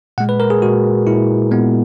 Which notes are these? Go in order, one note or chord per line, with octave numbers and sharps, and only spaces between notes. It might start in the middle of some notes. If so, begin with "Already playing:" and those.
A#2 G#3 F#5
B4
A#4
G#4
A#2 G#3 F#4
A#2 G#3 E4
A#2 G#3 B3